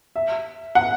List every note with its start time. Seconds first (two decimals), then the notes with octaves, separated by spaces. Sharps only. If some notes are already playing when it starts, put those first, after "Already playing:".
0.16 E5
0.75 F#5